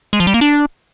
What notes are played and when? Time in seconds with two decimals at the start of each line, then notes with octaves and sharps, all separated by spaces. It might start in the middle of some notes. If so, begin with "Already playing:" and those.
0.13 G#3
0.20 F3
0.27 G3
0.34 A#3
0.41 D4